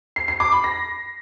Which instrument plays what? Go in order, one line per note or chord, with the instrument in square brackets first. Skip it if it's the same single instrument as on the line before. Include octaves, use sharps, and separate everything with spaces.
[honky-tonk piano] C7
C7
D6
B5
A#6